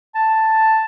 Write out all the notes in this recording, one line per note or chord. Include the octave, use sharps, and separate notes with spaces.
A5